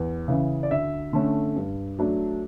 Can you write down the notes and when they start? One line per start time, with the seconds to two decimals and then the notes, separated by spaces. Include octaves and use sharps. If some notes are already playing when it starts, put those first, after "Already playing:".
Already playing: E2
0.28 C#3 E3
0.63 D5
0.71 D2 E5
1.13 D3 A3 C#4
1.56 G2
1.99 F#3 A3 D4